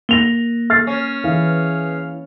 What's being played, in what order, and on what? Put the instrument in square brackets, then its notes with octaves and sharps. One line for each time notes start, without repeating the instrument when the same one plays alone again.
[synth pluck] A#3 [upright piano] A#6 F7 G7
[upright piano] F6 A6 C7
[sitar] C#4
[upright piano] E3 [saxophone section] G#4 B4 F5